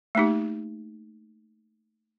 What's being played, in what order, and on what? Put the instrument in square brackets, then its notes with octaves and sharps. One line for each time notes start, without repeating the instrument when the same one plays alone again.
[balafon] A3 A#3 D#4 G4